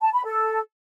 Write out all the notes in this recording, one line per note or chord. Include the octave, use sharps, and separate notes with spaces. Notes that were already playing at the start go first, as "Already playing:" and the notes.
A5
B5
A4